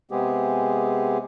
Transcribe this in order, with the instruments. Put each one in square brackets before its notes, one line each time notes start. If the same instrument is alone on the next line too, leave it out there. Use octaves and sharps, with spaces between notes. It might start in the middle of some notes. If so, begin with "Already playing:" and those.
[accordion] C3 G#3 B3 C4 G4 G#4